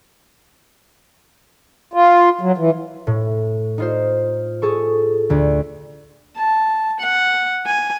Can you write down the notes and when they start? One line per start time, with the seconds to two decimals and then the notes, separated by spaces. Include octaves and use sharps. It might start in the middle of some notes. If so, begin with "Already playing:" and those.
1.93 F4
2.41 F#3
2.57 E3
3.07 A2
3.78 D#4 F4 C5
4.62 G#4 A4 C#6
5.30 D2 D3
6.36 A5
7.00 F#5
7.66 G#5